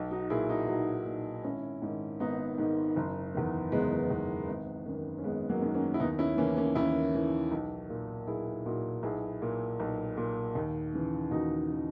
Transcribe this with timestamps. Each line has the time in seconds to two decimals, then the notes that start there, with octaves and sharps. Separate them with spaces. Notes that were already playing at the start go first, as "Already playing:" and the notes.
Already playing: B1
0.11 D#4 F#4
0.30 A#2 E4 G#4
0.49 D#4 F#4
0.68 B1 D#4 F#4
1.06 A#2
1.44 G#1 C#4 E4
1.82 G#2 D#3
2.20 G#1 B3 D#4
2.58 G#2 D#3
2.96 F#1
3.35 E2 D#3
3.72 F#1 G#3 B3
4.10 E2 D#3
4.48 G#1
4.86 F#2 D#3
5.18 C#4
5.24 G#1 G#3 B3
5.49 F#3 A#3
5.62 F#2 D#3
5.74 A#3 C#4
5.94 E4
6.00 D#2 B3 D#4
6.19 C#4 E4
6.37 E3 A#3 C#4
6.41 C#3
6.56 A#3 C#4
6.75 D#2 C#4 E4
7.14 C#3 E3
7.52 B1
7.90 A#2
8.27 B1 E4 G#4
8.66 A#2 D#4 F#4
9.03 B1 E4 G#4
9.42 A#2
9.80 B1
10.17 A#2
10.55 D#2
10.93 C#3 E3
11.31 D#2 D#4 F#4
11.69 C#3 E3